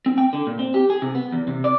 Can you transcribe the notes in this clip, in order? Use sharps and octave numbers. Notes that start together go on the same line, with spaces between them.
C4
G5
D3
A#2
C4
G4
G#4
C3
B3
E2
C3
D5